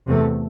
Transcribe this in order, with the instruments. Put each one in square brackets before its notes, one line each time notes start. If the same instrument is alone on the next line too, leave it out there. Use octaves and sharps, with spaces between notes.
[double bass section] E2 C3 A3